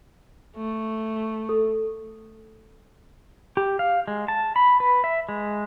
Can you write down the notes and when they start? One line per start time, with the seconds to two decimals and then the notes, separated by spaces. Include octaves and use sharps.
0.57 A3
1.49 A4
3.57 G4
3.79 F5
4.08 G#3
4.28 A5
4.56 B5
4.80 B4
5.04 E5
5.29 G#3